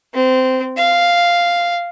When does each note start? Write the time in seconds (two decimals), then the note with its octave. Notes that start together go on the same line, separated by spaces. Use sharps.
0.14 C4
0.77 F5